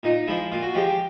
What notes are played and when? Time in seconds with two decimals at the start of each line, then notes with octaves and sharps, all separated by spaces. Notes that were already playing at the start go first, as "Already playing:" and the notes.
0.03 A#2 D#4
0.28 F3 G#3 E4
0.52 A#2 F4
0.63 F#4
0.74 F3 G#3 G4
0.87 G4